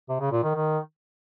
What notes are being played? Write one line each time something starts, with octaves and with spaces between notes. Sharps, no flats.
C3
C#3
A#2
D#3
D#3